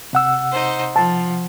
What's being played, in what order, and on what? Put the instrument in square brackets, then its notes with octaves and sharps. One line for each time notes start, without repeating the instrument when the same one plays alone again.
[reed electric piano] C3 F#5 E6
[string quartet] D#4 C5
[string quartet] F3 [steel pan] A5